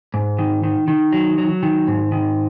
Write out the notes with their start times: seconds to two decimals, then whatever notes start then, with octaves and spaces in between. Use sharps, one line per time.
0.14 G#2
0.39 D#3
0.63 D#3
0.88 D#3
1.13 F#3
1.38 F#3
1.63 D#3
1.88 G#2
2.12 D#3